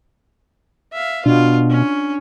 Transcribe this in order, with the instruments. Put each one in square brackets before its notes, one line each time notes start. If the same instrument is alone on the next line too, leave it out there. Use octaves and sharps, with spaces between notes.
[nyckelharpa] E5 F5
[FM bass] B2 [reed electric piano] D4 [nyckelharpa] F4
[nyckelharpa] C#4